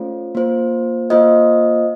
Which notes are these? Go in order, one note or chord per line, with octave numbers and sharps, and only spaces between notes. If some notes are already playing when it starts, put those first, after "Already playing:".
Already playing: A3 C#4 F4 C5
A#3 F4 C5
A#3 F4 C5 D#5